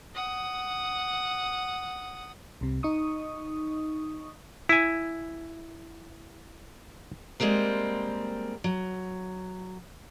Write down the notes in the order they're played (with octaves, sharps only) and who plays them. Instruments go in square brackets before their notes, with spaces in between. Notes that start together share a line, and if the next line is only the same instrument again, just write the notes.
[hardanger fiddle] F#5 D#6
[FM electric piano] C2 C3
D#4 C#6 D#6
[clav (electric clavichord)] E4 G#5
[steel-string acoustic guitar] G3 G#3 A#3 C4 A#4
F#3